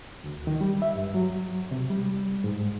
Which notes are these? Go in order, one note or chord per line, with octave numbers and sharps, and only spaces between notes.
D2
D#3
G3
E5
G2
F#3
C3
G3
G#2